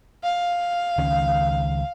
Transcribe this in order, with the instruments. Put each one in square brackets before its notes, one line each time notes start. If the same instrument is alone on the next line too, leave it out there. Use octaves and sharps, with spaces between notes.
[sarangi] F5
[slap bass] C#2 D#3 C#4